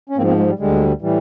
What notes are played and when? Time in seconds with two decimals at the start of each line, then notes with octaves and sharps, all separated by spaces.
0.09 C#4
0.17 G#2 A#3 C4
0.20 F3
0.27 A#3 C4
0.38 G#3
0.49 G3
0.59 D2 D3 G3 G#3
1.01 A2 E3 G3